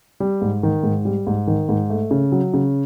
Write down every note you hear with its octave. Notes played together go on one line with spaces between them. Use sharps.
G3
G#2
D#3
G#2
G3
G#2
D#3
G#2
A3
C#3
F#3
C#3